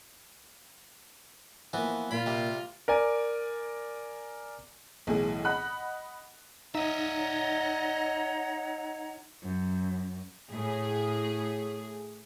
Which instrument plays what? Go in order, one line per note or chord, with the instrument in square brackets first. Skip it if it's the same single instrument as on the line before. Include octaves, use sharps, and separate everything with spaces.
[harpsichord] E3 B3 [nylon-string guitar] F3 A#3
[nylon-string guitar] A#2 A#3 F5 [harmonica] F4 [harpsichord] B5
[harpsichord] C3 G3
[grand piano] A#4 D5 G#5
[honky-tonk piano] B1 A2 E3 G#4
D#5 F#5 B5 F#6
[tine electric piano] D#4 [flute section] C#5 F#5 A#5 [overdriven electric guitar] D#5 E5
[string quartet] F#2
[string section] A2 G#4